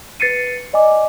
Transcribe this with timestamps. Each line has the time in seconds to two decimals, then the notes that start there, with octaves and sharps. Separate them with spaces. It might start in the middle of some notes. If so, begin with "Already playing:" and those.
0.20 B4 A6 C7 C#7 D#7
0.73 D5 D#5 G#5 D6